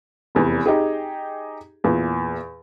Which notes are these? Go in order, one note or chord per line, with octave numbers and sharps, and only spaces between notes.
F1 E2
D#4 G4 G#4
E2 A#2